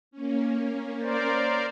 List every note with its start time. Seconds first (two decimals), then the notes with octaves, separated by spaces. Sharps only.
0.11 A#3 C#4
1.00 A#4 C5 D5